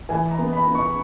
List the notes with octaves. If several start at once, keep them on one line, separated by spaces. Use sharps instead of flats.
E3 G#5
A#5
B3
B5
B3
C#6